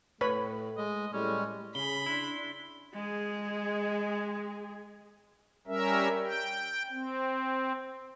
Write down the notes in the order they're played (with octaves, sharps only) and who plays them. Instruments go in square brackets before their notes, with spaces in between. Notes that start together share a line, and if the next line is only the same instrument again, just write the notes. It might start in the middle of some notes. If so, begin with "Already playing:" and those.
[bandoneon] A2 [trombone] A3 [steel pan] B4 C#5 B5
[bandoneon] G#3 [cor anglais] D#5
[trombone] A2 [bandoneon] G3 G#3 [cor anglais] C#4
[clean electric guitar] C#3 [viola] G#4 [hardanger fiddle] B5 [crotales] G7
[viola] D4 C6 [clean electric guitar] E4
[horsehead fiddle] G#3 G#4
[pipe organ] G3 C#4 A#4 E5
G5
C4